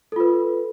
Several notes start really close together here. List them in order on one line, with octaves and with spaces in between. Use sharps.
A4 F4 B4